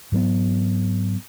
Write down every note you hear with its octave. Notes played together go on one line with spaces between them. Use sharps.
G#2 F#3 B3